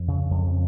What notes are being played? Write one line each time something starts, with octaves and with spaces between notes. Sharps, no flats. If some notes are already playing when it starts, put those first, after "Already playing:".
Already playing: F2
C#3
F2